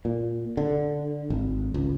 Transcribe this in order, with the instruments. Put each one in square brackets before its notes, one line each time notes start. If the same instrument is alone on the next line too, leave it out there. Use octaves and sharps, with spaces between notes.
[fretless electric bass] A#2
D3
G#1
C#2